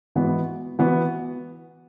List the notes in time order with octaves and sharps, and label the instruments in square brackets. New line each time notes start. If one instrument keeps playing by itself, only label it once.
[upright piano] G#2 E3 B3 F#4
E3 B3 F#4